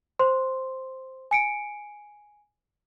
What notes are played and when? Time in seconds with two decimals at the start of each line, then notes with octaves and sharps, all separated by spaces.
0.19 C5 C6
1.31 G#5 C#7 D7